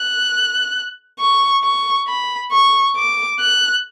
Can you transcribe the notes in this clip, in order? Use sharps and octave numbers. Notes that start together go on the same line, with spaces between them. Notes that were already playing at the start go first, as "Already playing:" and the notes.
Already playing: F#6
C#6
C#6
B5
C#6
D6
F#6